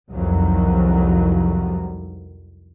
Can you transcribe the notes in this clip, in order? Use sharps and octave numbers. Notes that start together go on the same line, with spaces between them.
C2 F2 D#3 F#3 G3